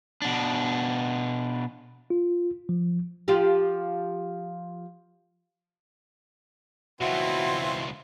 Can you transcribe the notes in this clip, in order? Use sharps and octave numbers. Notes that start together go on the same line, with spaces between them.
B2 D4
F4
F3
F3 F4 G4
C#2 B2 E3 C4 F4 F#4 E5 C6